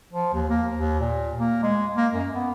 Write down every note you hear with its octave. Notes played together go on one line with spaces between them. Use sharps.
F3
D#2
A#3
D#2
A#2
A#3
G#3
A#3
F#2
B3